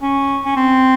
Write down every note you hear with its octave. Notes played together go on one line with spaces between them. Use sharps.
C#4
C#4
C4